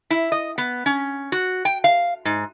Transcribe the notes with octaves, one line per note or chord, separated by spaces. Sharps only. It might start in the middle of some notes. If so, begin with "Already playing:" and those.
E4
D#5
B3
C#4
F#4
G5
F5
G#2